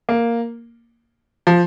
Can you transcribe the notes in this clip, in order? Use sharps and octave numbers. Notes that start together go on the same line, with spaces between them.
A#3
F3